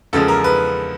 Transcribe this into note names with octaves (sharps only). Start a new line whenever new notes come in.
E2 C#3 F3 G#3 A4
A#4
B4